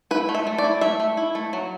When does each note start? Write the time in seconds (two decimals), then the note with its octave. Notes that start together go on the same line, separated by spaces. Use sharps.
0.11 E4 B4
0.29 A3
0.35 E5
0.47 A3
0.58 D5
0.64 E4
0.81 A3 E5
1.00 A3
1.17 E4
1.35 A3
1.53 F#3